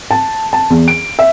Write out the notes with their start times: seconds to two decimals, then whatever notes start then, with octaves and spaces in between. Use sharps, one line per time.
0.11 A5
0.53 A5
0.70 E2
0.88 D7
1.19 E5